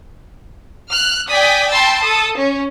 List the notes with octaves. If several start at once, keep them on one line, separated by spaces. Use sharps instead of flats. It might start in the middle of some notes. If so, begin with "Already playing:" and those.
F6 F#6
D5 G5 G#5 D#6 B6
G5 A5 B5 C6 E6 A6
A4 D#6
C#4